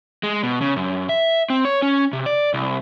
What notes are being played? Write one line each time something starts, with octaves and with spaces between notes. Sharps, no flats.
G#3
B2
C#3
F#2
E5
C4
C#5
C#4
C3
D5
C2